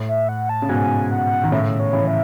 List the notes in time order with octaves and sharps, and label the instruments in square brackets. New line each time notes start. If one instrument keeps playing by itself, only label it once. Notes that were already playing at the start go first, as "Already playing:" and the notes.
Already playing: [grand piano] A2
[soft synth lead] E5
F#5
A5
[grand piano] C#3
[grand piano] G#2 B2 [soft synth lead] G#5
[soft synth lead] F#5
[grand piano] D#3
[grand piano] A2 C#3 [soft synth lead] E5
[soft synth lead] C#5
[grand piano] C#3 E3
[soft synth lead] E5